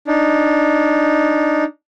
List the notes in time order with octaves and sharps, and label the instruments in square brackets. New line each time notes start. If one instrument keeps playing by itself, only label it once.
[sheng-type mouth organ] D4 D#4